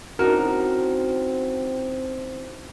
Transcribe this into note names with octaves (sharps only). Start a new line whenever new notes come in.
C4 C#4 D#4 E4 F#4 A#4 A5